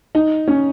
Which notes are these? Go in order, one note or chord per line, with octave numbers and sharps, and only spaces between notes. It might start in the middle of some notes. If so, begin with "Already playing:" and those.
D#4
C#4